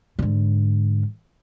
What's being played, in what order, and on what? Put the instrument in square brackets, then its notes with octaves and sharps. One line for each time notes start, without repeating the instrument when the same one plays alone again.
[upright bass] G#2 D3